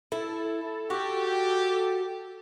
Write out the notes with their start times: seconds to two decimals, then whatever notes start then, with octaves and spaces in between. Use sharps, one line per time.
0.12 E4 A4
0.90 F#4 G4